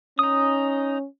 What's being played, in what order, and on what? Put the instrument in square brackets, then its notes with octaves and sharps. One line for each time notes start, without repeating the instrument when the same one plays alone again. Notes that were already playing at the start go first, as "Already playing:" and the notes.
[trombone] C#4 [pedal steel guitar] D#4 D#6